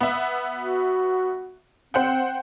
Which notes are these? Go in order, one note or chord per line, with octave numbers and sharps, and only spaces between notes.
B3 E5
F#4
C4 C5 F#5 G5